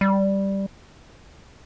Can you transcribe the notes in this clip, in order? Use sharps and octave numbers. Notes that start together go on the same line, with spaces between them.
G3